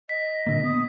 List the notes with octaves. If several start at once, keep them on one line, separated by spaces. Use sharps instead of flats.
D#5 B6
A#2 D3 A#3
B3 D#6